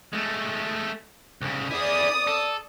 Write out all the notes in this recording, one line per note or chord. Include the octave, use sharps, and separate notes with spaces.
G#3 A3
C2 C#3
E4 G#4 D5 D#6
A4